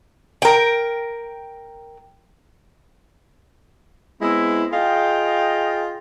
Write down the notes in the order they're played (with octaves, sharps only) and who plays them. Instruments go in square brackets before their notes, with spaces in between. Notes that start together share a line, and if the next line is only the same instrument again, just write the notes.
[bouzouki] A#4 G5
[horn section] G#3 B3 C4 E4
F4 G#4 D#5 F5 G5